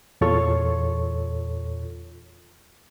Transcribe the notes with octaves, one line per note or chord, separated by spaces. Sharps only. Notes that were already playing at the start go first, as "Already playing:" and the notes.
E2 A#2 F4 A4 C#5 C#6